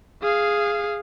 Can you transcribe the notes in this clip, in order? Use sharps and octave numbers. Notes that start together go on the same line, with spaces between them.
G#4 F5